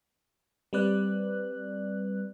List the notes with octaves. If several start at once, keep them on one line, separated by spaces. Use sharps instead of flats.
G3 C4 B4 D5 F#6